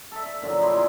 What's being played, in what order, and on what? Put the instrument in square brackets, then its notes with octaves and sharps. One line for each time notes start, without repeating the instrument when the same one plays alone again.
[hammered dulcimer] A4 E5
E5
A#2 D3 F3 F#3
D#4 E4 D5 C6
B2 G#3 C6